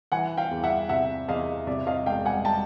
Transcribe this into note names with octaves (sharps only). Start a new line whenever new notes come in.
E3 F#5 G#5
F5 G5
E2
E5 F#5
C3 E5 F#5
E2 D#5 F5
C3 D5 E5
D#5 F5
E1 F5 G5
F#5 G#5
G5 A5